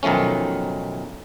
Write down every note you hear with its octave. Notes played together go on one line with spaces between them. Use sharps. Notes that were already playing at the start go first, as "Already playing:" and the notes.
B1 D#3 F3 A3 C#4